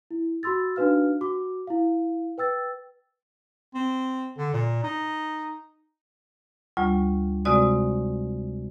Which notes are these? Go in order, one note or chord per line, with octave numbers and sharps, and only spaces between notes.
E4
F#4 B5 C6 E6 A6
D4 D#4 F#4 B4 F5 F6
F#4 D6
E4 F5
B4 G5 E6 A6
C4
D3
A#2
D#4
D2 G3 F4 C#6
C3 G#3 C4 F#4 D5 D#6